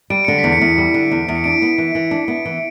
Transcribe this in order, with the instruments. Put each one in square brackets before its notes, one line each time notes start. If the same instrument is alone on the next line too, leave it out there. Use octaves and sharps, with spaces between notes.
[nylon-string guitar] G3 [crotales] D7
[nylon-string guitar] D3 [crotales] C#7
[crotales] B6
[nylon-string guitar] E2
[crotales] C#7
[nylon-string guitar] E2
G3
D3
E2
E2
[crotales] C#7
[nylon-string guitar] D4 [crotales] D7
[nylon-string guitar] B3
E3
E3
D4
B3
E3